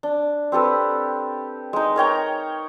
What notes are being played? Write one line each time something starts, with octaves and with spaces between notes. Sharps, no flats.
D4
C4 G4 A4 B4
G#3 D#4
A#4 C#5 G5 A#5